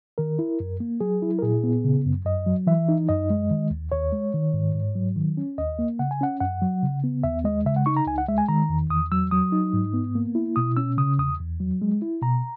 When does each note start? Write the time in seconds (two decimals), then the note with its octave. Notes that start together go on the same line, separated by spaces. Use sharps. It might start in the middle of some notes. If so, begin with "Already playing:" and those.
0.18 D#3 A#4
0.39 E4
0.60 F#2
0.80 A#3
1.00 F#3 G#4
1.22 E4
1.39 A#4
1.42 A#2 G#4
1.64 B3
1.84 C#3
2.06 F#2
2.25 F#2 D#5
2.47 F#3
2.67 E3 E5
2.89 D#4
3.09 F#2 D#5
3.30 G#3
3.51 D#3
3.71 D#2
3.92 D#2 C#5
4.12 G#3
4.34 D#3
4.54 G#2
4.75 G#2
4.95 F#3
5.16 D#3
5.37 C#4
5.58 D#2 D#5
5.79 A#3
5.99 C#3 F#5
6.11 G#5
6.21 C#4 F#5
6.40 F#2 F#5
6.62 F#3
6.83 C#3
7.04 B3
7.24 D#2 E5
7.44 G#3 D#5
7.66 C#3 E5
7.76 F#5
7.86 D#4 C#6
7.97 A#5
8.07 C#2 G#5
8.18 F#5
8.28 G#3 E5
8.38 G#5
8.49 D#3 A#5
8.69 E2
8.90 E2 D#6
9.12 F#3 E6
9.31 F#3 D#6
9.52 D#4
9.73 G#2
9.93 B3
10.15 A#3
10.35 E4
10.56 B2 D#6
10.77 C#4 E6
10.98 C#3 D#6
11.18 E2 D#6
11.40 E2
11.60 F#3
11.82 G#3
12.02 E4
12.22 B2 A#5